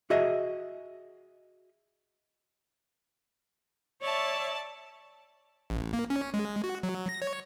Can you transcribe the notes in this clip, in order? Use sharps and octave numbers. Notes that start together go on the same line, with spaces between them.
F#4 G#4 D#5 E5
C#5 D5 E5 A5
A1
A#3
C#4
G#3
F#4
F#3
A#6
C#5